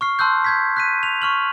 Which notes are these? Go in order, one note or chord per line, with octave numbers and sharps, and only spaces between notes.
C#6 F6 C7
A5 C6 E6 F#6 G6
G6 G#6 B6
F#6 B6 D#7
F7
C#6 F6 F#7